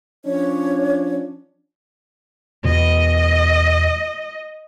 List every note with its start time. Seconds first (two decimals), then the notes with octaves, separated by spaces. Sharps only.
0.25 F3 C#4 D4 C#5
2.65 E2 B2 D#5